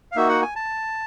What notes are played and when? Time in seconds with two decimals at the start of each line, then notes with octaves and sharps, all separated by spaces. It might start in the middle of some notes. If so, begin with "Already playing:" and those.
0.12 F5
0.16 A#3 D#4 F#4 E5
0.29 F#5
0.42 G#5
0.56 A5